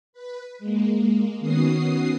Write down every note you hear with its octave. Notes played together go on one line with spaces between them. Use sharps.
B4
G#3 A#3
D#3 B3 C#4 F#4 D#6 C7